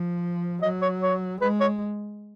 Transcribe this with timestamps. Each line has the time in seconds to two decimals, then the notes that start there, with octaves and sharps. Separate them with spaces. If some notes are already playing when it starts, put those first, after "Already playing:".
Already playing: F3
0.62 F#3 D#5
0.82 C#5
1.02 C#5
1.41 G#3 B4
1.60 C#5